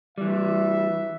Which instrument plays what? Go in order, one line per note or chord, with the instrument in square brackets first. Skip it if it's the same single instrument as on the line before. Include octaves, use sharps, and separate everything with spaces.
[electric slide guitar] E3 G3 [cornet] E5